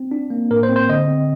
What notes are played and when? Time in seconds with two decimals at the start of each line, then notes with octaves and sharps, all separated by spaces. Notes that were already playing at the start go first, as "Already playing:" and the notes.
Already playing: C4
0.11 D4
0.30 A#3
0.51 A2 A#4
0.63 C5
0.69 C4
0.76 C5
0.89 D3 D#5
1.08 C4